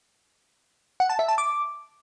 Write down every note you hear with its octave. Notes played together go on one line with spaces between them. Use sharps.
F#5
A5
E5
A5
D6